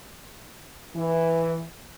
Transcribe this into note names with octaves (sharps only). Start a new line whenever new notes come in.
E3